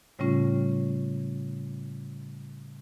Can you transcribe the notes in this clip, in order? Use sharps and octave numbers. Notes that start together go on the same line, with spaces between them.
A2 C#3 G3 A3 C#4 F4